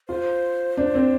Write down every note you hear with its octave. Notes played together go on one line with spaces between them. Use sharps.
F4 C5
D4
C4